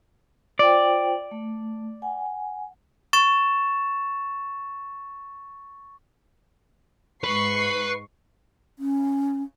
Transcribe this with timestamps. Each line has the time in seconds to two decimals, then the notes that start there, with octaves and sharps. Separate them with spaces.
0.59 F4 C5 D5 G5
1.31 A3
2.02 F#5 G#5
3.13 C#6 A6 E7
7.24 G#2 B4 C#6 C7
8.78 C#4